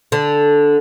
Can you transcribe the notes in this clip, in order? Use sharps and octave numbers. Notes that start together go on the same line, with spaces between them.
D3